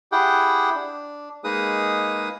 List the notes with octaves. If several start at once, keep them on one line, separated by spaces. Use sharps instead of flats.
E4 G4 G#4 F#5 G5
D4
G#3 A#3 D#4 G#4 B4 D#6